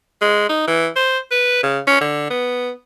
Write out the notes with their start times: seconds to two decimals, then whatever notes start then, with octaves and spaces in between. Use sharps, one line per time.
0.22 G#3
0.49 D#4
0.68 E3
0.96 C5
1.31 B4
1.63 C#3
1.87 C#4
2.01 D3
2.31 B3